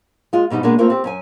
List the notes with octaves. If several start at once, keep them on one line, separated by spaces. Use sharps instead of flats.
G#3 F4
G#2 B2 G3 D#4
B2 G#3 A#3 D4
A3 A#3 C4 F4
C4 G4
F#2 C#4 G#5